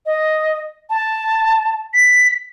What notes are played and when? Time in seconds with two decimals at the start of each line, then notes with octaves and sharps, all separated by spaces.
0.06 D#5
0.90 A5
1.94 B6